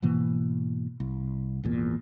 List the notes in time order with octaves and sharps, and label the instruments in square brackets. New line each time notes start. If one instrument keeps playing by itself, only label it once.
[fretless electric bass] G#2 B2 E3 A#3
C2
G#1 E2 A#2